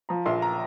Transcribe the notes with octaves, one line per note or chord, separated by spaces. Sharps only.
F3 A#5
A#1 C6
A#5